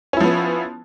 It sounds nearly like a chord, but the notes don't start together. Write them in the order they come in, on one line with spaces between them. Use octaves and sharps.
C#4 E4 F3 B3